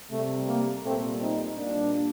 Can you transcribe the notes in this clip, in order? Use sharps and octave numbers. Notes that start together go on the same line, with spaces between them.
C3 G3 A3
A#3
A#2 G3 A3 C4
C4 D#4
A#2 G3 A#3 D4